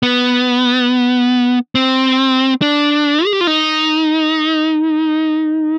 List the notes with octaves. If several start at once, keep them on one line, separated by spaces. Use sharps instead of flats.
B3
C4
D4
G#4
G4
F4
D#4